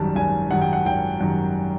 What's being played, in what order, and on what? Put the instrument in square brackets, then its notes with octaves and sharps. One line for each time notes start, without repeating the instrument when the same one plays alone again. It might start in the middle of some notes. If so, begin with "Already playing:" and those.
Already playing: [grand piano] G#1 F#2 D#3 G3 A5
G#1 G#5
F#2 D#3 G3 F#5
G5
F#5
G#1 G5
F#2 D#3 G3